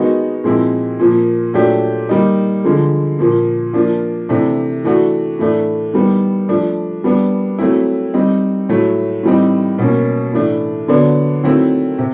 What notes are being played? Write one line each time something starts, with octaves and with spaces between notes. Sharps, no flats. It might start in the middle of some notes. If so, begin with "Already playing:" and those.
Already playing: D#3 G#3 B3 D#4 F#4
A#2 F3 G#3 C4 E4
A#2 F3 A#3
A#2 F#3 A3 D4 G4
D#3 G3 A#3 D#4
D3 F3 G#3
A#2 F3 A#3
F3 A#3 D4 F4
C3 E3 A3 D4
E3 A3 D4 F#4
A2 E3 A3 D4
D#3 G3 B3
F3 A3 D4
G3 B3 D4
F#3 A3 C4 E4
G3 C4 D#4
A2 F#3 A3
A2 E3 G3 C4 D#4
B2 F#3 A#3 C#4
A2 E3 A3 D4
D3 F#3 B3 D4
D#3 F#3 A3 C4 E4
C3